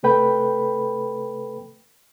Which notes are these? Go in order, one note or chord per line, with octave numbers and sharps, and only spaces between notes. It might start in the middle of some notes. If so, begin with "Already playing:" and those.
C3 A3 A4 B4 G5 B5